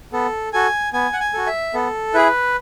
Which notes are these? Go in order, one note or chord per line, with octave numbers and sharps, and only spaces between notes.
B3 A4
F#4 A4 G#5
B3 G#5
F#5
G#5
F#4 A4
E5
B3 A4
E4 G#4 B4